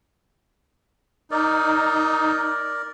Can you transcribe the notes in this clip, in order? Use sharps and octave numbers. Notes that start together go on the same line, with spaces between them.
D#4 A#4 D5